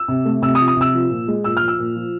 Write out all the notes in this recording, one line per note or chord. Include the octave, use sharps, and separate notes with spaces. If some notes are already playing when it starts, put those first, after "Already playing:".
Already playing: E6
C3
A3
C3 E6
D#6
F3
D#6
C3 E6
F3
A#2
G#3
A#2 E6
F3 F6
E6
A#2
F3